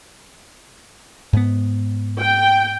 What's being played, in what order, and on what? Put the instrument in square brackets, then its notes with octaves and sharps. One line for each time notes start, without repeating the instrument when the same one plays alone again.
[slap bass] G#2 B3
[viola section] G5